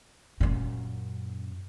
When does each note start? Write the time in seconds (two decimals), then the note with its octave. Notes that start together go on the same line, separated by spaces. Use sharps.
0.40 F#2 A#2